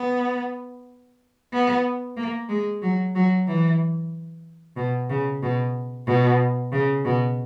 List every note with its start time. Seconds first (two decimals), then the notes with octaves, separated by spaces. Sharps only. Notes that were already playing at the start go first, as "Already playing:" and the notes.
Already playing: B3
1.53 B3
2.17 A#3
2.49 G#3
2.83 F#3
3.15 F#3
3.47 E3
4.77 B2
5.10 C#3
5.43 B2
6.07 B2
6.72 C#3
7.05 B2